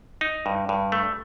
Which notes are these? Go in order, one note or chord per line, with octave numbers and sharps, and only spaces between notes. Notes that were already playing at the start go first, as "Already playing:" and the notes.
D#4
G2
G2
A3